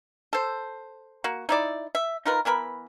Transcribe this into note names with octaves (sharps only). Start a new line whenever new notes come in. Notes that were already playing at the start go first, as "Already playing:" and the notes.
A4 C5
A#3 F#4
D#4 E4 D5
E5
D#4 F4 A#4 B4
E3 B3 A#4 B5